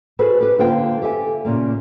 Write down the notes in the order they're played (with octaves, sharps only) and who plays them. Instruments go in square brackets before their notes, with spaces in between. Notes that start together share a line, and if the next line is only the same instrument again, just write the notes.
[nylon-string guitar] F#4 G#4 A4 B4 C5
G4 B4
D3 A#3 F4 C5 F5 G5
G4 A4 E5 G#5
A#2 C#3 A#3